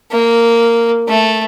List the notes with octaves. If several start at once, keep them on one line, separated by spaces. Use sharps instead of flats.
A#3
A3